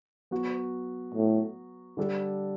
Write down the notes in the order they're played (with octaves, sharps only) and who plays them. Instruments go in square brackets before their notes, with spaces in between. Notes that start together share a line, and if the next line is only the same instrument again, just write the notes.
[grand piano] F#3 B3 F#4
[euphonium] A2
[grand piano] D3 G3 D4 A4